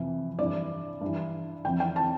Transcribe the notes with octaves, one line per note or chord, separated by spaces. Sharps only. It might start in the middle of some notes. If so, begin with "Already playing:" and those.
Already playing: F2 C3 E3
G2 E3 D5
G2
E3
F2 E3 G5
G5
A5